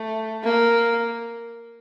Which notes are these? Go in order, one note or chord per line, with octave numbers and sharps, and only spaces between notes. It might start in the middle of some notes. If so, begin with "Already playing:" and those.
Already playing: A3
A#3